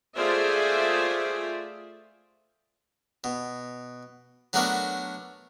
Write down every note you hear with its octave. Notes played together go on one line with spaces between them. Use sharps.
A3 F4 G#4 C5 D5 E5
B2
F#3 A3 B3 D4 F#4 A#4